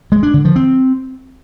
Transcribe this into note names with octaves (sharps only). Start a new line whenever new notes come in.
G#3
D4
D3
F3
C4